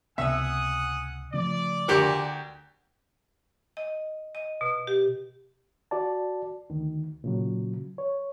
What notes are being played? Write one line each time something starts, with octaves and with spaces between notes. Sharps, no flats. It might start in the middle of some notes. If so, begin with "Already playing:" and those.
C#2 C3 B3 E5 F#5 G#5 D#6 E6
C#3 F3 A3 D5
D2 G4 A#4
D#5
D#5
B2
G4
F#4 D5 A5
D2 D#3
A#2 C#3 F#3
C#5